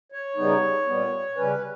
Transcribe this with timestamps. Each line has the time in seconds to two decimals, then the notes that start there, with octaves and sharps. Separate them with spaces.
0.12 C#5
0.36 C#3 G3 B3 D#4
0.87 A#2 G3 B3
1.36 C#3 G3 C#4 B4